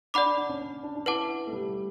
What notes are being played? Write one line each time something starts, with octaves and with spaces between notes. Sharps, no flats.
D4 D5 F#5 B5 D6
D4
D4
C#4
D4
D4
D4
E4 B4 F#5 A5 D6
A3
G3